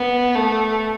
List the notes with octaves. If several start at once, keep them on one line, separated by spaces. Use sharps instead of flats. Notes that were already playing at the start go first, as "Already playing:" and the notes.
Already playing: B3
A3